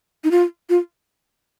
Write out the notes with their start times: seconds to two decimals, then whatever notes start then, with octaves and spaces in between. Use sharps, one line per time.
0.24 D#4
0.31 F4
0.69 F4